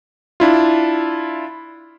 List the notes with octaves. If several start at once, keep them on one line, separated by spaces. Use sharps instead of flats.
D4 E4 F4